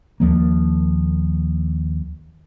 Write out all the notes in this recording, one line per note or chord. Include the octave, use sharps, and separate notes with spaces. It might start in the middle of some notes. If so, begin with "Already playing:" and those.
D#2 F3 A#3